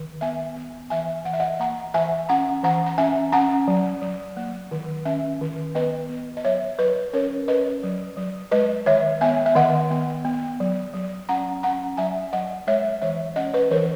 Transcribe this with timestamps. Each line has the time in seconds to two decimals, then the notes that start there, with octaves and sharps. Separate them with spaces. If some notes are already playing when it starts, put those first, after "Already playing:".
Already playing: D#3
0.21 B3 E5 G#5
0.57 B3
0.90 E3 E5 G#5
1.25 E3 F#5
1.33 E5
1.40 D#5 F#5
1.60 A#3 F#5 A#5
1.94 E3 E5 G#5
2.29 C#4 F#5 A#5
2.63 E3 F#5 A#5
2.86 A#5
2.98 C#4 E5 G#5
3.33 C#4 F#5 A#5
3.68 F#3
4.02 F#3
4.37 A#3
4.71 D#3
5.05 C#4 E5 G#5
5.41 D#3
5.75 B3 B4 D#5
6.10 B3
6.37 D#5
6.44 F#3 C#5 E5
6.78 F#3 B4 D#5
7.13 C#4 A#4 C#5
7.48 C#4 B4 D#5
7.83 F#3
8.17 F#3
8.52 G#3 B4 D#5
8.86 D#3 C#5 E5
9.21 B3 E5 G#5
9.46 E5
9.56 D#3 D#5 F#5
9.90 B3
10.25 B3
10.60 F#3
10.94 F#3
11.29 C#4 F#5 A#5
11.63 C#4 F#5 A#5
11.97 F#3 E5 G#5
12.33 F#3 D#5 F#5
12.67 G#3 C#5 E5
13.02 E3 C#5 E5
13.36 C#4 D#5 F#5
13.54 B4 D#5
13.71 E3 A#4 C#5